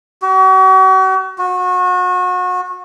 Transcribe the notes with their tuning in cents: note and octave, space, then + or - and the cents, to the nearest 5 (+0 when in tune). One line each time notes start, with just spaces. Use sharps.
F#4 +40
F#4 -30